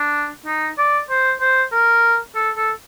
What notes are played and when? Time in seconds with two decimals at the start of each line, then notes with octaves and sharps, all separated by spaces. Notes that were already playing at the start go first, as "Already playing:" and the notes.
Already playing: D4
0.46 D#4
0.78 D5
1.10 C5
1.41 C5
1.72 A#4
2.35 A4
2.56 A4